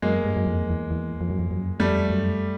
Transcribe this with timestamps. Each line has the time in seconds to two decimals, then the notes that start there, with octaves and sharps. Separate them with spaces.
0.02 F#2 G#3 A#3
0.25 G2
0.37 F#2
0.47 F2
0.70 E2
0.91 E2
1.21 F2
1.30 F#2
1.39 F2
1.51 F#2
1.80 F2 G3 A3
2.10 F#2